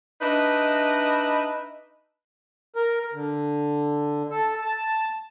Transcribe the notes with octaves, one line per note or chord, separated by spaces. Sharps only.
D4 D#4 B4 D#5 E5
A#4
D3
A4
A5